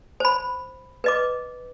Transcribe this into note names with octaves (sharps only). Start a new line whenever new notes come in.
C5 B5
B4 D#5 D6